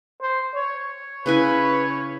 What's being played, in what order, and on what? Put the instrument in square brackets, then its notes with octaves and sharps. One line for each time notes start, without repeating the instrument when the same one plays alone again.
[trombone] C5
C#5
[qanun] C#3 E4 G#5 [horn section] B4